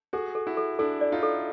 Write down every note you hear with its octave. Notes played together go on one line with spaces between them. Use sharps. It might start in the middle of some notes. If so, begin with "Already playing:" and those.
F#4 G#4 A4
A4
E4 F#4
A4
D4 E4 A4
D5
D#4 F4
A4